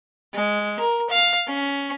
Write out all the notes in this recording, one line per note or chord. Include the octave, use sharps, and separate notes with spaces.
G#3
A#4
F5
C#4